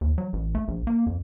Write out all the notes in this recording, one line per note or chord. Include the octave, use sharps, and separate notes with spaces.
D#2
F#3
A1
A3
A#1
A#3
F2